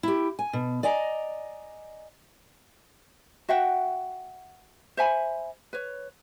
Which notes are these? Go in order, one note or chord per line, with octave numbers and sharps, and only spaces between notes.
E4 G4
G#5
B2
D5 D#5 G#5 A#5
F#4 E5 F#5 G5
C5 E5 G#5 B5
B4 C#5